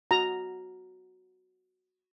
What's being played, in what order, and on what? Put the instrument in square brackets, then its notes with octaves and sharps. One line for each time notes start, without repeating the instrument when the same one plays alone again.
[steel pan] F#4 A#5